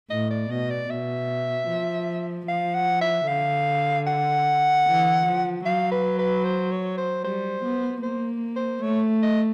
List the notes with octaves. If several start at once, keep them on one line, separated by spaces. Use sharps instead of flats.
A2 D#5
D5
B2 D#5
D5
B2 E5
F3
F3 F5
F#5
E5
D3 F5
F#5
E3
F3
F#3 F5
B4
B4
C5
C#5
C5
G3 C5
B3
A#3 C5
C5
A3 C#5
D#5